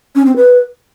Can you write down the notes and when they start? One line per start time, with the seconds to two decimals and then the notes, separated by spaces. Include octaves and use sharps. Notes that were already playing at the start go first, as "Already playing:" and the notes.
0.15 C#4
0.26 C4
0.36 B4